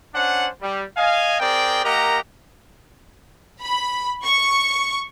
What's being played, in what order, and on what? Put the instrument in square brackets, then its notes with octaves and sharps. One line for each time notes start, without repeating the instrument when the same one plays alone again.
[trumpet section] C#4 D4 C5 F#5
G3
D#5 F5 G#5
C4 G#4 A#4 D5 G5
A#3 G4 A#4 D#5 F#5 A#5
[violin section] B5
C#6